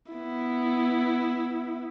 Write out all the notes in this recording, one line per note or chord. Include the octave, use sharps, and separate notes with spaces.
B3 E4